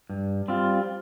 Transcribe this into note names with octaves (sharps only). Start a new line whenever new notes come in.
G2
G3 C4 F4